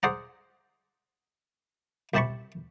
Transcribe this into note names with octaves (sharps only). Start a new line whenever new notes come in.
G#4 C5 D5 F#5 A#5
C2 C3 G4 A5 B5 C#6